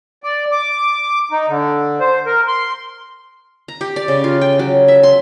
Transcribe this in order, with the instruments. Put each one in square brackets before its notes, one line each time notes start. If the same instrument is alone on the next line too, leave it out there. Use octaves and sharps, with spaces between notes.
[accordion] D5
D6
D#4
D3
C5
A#4
C6
[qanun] A#5
G4
D5
C#3
F4
G5
F#3
E5
C6